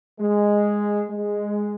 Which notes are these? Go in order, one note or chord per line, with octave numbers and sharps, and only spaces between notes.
G#3
G#3